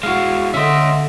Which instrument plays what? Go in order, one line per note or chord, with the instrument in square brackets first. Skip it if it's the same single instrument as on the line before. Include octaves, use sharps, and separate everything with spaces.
[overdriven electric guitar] G#3 E4 [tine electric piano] F#4 F5
[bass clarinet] D3 [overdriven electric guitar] C#4 C6 [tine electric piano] D#5 E5